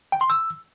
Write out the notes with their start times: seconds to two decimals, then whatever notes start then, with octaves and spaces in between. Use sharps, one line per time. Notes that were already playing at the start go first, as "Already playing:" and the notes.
0.12 G5
0.21 C6
0.30 E6